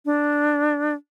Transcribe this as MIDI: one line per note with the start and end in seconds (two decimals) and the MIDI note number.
0.05 0.94 62